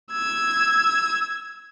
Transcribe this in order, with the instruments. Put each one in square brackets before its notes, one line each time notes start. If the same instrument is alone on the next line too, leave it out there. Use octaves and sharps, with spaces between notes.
[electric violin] E6 G#6